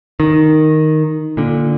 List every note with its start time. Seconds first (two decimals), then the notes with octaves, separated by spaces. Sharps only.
0.20 D#3
1.37 A#2 D3